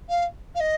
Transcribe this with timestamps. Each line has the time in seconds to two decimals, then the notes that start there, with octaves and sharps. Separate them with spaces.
0.09 F5
0.55 F5
0.60 D#5